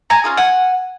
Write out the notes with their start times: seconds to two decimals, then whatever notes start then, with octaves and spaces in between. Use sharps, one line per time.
0.10 G#5 A#5
0.24 C#4 F4 G#4
0.37 F#5 G#5